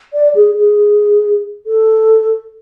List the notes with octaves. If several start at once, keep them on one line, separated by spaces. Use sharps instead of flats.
D5
G#4
G#4
A4